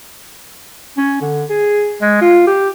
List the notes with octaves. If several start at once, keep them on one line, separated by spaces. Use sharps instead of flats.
C#4
D3
G#4
G#3
F4
G4